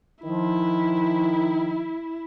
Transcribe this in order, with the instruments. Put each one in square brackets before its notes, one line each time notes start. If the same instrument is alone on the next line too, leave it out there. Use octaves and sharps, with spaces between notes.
[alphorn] D#3 [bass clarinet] F3 [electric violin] E4